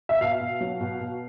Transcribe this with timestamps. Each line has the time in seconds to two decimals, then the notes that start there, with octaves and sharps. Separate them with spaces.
0.09 E5
0.21 B2 F5
0.41 B2
0.61 F#3
0.81 B2
1.00 B2